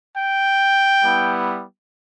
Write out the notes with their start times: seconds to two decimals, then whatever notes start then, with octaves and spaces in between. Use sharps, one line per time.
0.16 G5
1.03 G3 B3 E4